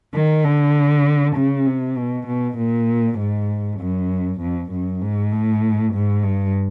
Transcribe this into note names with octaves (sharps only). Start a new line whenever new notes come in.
D#3
D3
C#3
C3
B2
B2
A#2
G#2
F#2
F2
F#2
G#2
A2
G#2
G2